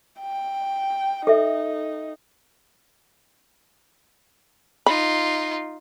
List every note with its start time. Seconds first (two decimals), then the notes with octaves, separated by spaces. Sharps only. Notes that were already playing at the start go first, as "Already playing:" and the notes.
0.20 G5
1.27 D#4 A4 E5
4.86 D#4 F4 B5